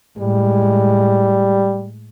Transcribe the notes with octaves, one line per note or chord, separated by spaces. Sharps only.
A2 G3 G#3